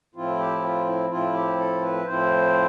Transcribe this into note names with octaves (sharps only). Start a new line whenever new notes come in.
A2 F3 C4 E4 F4
G4
F4
E4
A2 F3 C4 E4 F4
G4
A4
B4
A2 F3 C4 E4 C5